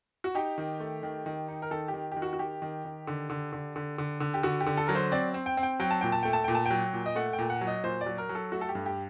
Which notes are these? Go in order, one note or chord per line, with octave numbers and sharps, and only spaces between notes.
F#4
D#4 G4
D#3
A3
D#3
D#3
D#4
A#4
D#3 A4
G4
D#3
D#3 G4
F#4
F#4
D#3 G4
D#3
D#3
D3
D3
D3
D3
D3
D3
G4
D3 F#4
G4
D3
A4
F#3 A#4
C5
C4 D5
C4
G5
C4
G5
F#3 G5
A5
A#2 G5
A5
A3 G5
A5
A#2 G5
A5
F#3 G5
A#2
D#5
A3 F#5
G5
A#2
F#5
F#3
D#5
A#2 C5
D5
F#3
A#4
F#3
A4
A3 F#4
A4
G4
G2
G4